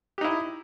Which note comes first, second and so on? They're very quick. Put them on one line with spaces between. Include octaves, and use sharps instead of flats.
G4 D#4 E4